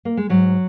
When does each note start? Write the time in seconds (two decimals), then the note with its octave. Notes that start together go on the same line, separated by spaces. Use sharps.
0.05 A#3
0.17 G#3
0.29 G#2 F#3